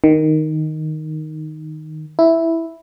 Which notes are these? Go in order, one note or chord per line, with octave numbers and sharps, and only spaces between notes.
D#3
E4